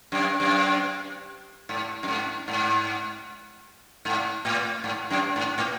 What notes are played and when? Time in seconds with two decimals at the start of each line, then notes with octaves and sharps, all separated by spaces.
0.12 F#2
0.40 F#2
1.69 G#2
2.03 F#2
2.08 G#2
2.48 G#2
4.05 G#2
4.45 A2
4.84 G#2
5.10 F#2
5.36 G#2
5.58 A2